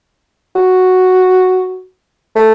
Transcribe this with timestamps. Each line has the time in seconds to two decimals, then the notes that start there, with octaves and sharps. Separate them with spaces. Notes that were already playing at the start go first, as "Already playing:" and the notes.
0.56 F#4
2.36 A3